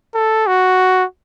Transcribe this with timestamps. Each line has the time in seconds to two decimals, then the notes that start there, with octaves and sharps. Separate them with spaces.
0.15 A4
0.47 F#4